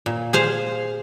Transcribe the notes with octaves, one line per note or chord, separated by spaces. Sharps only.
A#2
G#4 C5 F5